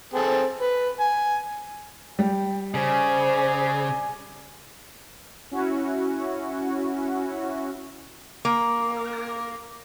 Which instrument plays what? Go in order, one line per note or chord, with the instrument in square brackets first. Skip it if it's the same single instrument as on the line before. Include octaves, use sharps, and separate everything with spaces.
[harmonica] C4 G#4 A4
B4
G#5
[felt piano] G3 [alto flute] G5
[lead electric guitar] C#3 [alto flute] C5 [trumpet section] D5 G#5
[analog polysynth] C#4 E4 F#4
[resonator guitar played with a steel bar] A#3